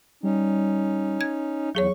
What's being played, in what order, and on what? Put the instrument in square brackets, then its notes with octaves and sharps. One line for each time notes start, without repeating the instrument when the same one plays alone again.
[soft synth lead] G3 [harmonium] C#4 D#4
[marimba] G#6
[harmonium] E2 [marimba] F#3 G#4 C#5 [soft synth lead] C#6